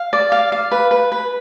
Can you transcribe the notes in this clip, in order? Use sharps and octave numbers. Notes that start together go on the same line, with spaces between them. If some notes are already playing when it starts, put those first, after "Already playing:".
Already playing: F5
D5
F5
F5
B4
B4
B4